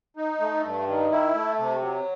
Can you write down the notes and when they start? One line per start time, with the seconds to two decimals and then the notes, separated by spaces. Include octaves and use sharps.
0.17 D#4
0.40 A3
0.64 G2
0.87 D#3
1.11 E4
1.34 A3
1.58 C3
1.82 F#3